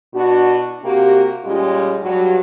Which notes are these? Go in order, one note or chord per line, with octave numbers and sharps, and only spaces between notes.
B2 D4 E4 F#4
C3 A#3 F#4 G4
A#2 G3 G#3 C#4 F4
G2 F#3